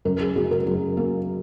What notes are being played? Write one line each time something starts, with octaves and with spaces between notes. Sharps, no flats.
F#2 A#4
G#4
F#3 G#4
A#4
F#3
A#3